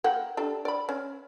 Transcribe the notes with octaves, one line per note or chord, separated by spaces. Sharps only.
A#3 F#5 G5
D4 G4 A4
D5 B5
C#4